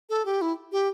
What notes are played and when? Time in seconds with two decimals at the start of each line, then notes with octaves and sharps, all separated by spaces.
0.09 A4
0.25 G4
0.41 E4
0.72 G4